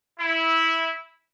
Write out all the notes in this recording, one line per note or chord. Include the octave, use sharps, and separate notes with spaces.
E4